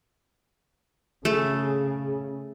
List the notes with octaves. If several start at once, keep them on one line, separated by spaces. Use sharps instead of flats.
C#3 A3 G#4